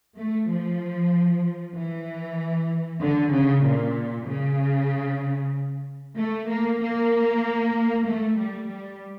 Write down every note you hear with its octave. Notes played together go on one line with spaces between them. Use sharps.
A3
F3
E3
D3
C#3
A#2
C#3
A3
A#3
A#3
A3
G3
G3